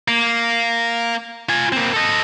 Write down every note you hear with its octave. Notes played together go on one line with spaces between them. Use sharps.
A#3
F4 G#5
A#3 C4
A4 D#5